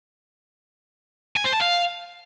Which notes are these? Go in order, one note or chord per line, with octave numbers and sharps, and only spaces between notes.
G#5
C5
A5
F5